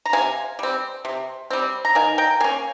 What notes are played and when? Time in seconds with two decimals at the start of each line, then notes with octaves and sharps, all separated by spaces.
0.05 A#5
0.13 C3 F5 G#5
0.59 G3 C4
1.05 C3
1.50 G3 C4
1.85 A#5
1.95 D#3 F5 G#5
2.18 G5 A#5
2.40 A#3 C#4 F5 G#5